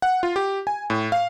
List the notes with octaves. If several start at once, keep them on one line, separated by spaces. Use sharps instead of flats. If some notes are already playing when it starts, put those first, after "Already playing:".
F#5
F4
G4
G#5
A2
F5